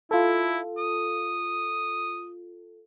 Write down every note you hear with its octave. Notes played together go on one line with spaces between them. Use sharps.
E4 F4 A4
D#6